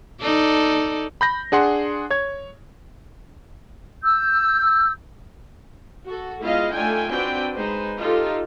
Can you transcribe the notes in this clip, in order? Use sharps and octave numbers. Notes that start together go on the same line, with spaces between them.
D#4 A4 D5
B5 G6 A#6
D4 G#4 F#5 C6
C#5 G#6
E6 G6
F#4 A4
G#3 B3 E4 F4 D#5 F5
A3 D4 D#4 F4 G5 G#5
C4 D4 F#4 B4 G5
G#3 D#4 B4 C5
D#4 F4 G4 A4